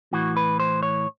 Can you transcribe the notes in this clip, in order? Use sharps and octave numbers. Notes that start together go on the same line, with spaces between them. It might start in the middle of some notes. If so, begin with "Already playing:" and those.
A2 E3 F#4
B4
C5
C#5